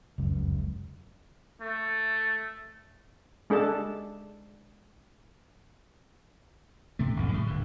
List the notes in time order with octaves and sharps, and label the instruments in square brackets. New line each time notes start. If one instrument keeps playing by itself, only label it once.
[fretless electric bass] F1 C#2 F#2
[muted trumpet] A3
[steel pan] G#3 D4 A4 A5
[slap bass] C3 A3
A1 F2 C#3
A2 C#3 G3
D1 D3